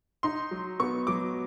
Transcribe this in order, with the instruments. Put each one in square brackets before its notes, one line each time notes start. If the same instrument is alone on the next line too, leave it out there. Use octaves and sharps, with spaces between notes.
[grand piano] D#4 [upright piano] C6
[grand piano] F#3
[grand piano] B3 [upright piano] C#6
[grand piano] F#3 [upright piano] D6